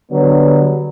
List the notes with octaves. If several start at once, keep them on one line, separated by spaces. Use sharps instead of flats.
D3 F#3 G3 B3 D4